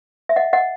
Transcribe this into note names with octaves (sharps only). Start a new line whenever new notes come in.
E5
D#5 F#5
D#5 F#5